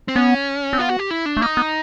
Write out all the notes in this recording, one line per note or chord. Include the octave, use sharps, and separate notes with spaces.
C4
B3 C#4
C4
B3 F4
F#4
G4
E4
D4
A3
A#3 D#4
B3